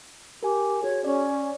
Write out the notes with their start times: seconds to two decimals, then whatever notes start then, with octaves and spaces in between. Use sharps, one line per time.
0.43 G4 A#4 G#5
0.83 F#4 G#4 C#5
1.04 C#4 C#5 D5